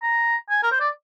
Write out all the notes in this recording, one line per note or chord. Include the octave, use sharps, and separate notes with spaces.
A#5
G#5
A#4
C5
D5